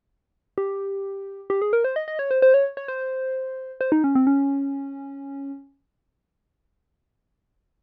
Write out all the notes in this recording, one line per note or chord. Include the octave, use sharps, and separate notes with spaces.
G4
G4
G#4
A#4
C5
D#5
D#5
C#5
C5
C5
C#5
C#5
C5
C5
D#4
C#4
C4
C#4